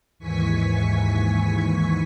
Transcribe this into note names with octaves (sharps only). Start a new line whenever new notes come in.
D#2 G#2 E3 G#5 C#6 B6